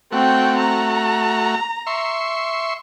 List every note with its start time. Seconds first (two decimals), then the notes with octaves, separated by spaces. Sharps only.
0.12 A3 C4 F#4 G5
0.58 A#5
1.87 E5 C6 C#6